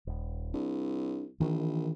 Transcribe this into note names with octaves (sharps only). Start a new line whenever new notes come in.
D#1
C2 D4
A#1 D#3 E3